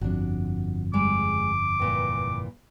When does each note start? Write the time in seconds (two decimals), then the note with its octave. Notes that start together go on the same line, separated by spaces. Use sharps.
0.01 G1 F2 D4 F#4
0.94 G3 G#3 D6
1.80 G2 A#2 E3